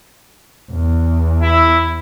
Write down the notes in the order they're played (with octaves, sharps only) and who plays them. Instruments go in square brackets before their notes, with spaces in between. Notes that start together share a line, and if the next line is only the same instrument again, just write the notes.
[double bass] E2
[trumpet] E4